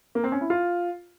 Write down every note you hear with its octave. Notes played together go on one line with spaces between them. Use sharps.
A#3
C4
C#4
E4
F4